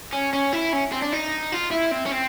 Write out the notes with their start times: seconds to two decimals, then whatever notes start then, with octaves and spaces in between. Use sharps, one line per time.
0.13 C#4
0.33 C#4
0.53 E4
0.73 C#4
0.92 C4
1.02 D4
1.13 D#4
1.53 F4
1.71 E4
1.92 C4
2.06 C#4
2.12 C4